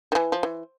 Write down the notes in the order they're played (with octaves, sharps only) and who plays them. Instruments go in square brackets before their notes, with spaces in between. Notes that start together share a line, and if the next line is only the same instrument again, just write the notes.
[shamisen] D#3
E3
F3
E3